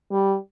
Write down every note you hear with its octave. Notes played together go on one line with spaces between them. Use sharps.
G3